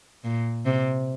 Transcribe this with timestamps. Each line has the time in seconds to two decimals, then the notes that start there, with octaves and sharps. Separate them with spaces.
0.24 A#2
0.66 C3